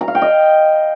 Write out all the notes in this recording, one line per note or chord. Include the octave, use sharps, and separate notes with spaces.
A#5
F5
G5
D#5